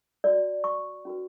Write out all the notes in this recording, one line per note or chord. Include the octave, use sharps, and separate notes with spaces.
F#4 C#5 D5
C#6
C#4 F#4 B4